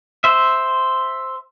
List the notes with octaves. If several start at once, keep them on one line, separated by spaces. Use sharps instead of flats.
C5 E5